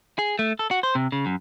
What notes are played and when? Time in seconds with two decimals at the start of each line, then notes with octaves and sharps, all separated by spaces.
0.19 G#4
0.39 A3
0.59 A4
0.71 F#4
0.83 C5
0.95 C3
1.12 C#3
1.26 F#2